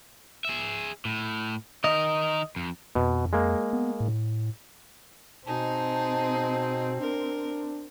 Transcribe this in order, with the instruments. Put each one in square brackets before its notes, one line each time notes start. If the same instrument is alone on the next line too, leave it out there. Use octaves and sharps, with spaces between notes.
[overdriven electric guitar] G#4 E5
A2
[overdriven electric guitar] D#3 A#4 [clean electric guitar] D#5
[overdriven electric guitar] F2
[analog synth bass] F2 [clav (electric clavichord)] B2
[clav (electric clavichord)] G#3 A#3
[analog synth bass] B3
A2
[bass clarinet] B2 [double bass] C4 [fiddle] D#4 G#4 [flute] A5
[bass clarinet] D4 [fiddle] A#4